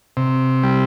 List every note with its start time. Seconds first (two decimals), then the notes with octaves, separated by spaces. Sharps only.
0.17 C3
0.63 G3